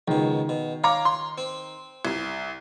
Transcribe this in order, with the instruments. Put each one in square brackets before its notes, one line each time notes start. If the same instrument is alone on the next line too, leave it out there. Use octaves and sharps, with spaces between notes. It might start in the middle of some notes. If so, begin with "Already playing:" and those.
[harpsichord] C#2 B2 [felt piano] D#3
[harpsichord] B2
[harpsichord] C#5 [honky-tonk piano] F5 A#5 D6
[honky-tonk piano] C6
[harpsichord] C4
[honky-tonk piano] C2